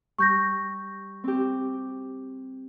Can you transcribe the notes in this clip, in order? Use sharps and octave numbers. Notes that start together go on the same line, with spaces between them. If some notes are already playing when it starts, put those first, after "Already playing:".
G3 C#6 G6 A#6
C4 G4